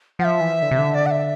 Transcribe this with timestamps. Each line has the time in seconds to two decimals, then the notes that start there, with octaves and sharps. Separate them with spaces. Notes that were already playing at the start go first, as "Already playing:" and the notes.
0.19 F3 F#5
0.24 E5
0.41 E3
0.62 D3
0.71 C3
0.79 D3
0.94 D5
1.06 F#5
1.11 E5